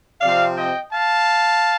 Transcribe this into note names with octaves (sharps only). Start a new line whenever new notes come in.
C3 F3 C4 D5 F5
D#5 G5
F5 A5